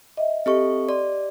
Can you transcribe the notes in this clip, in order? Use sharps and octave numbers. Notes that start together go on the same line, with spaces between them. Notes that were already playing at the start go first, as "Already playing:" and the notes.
D#5 E5
C4 G4 A4 D#5 C#6
D5 C6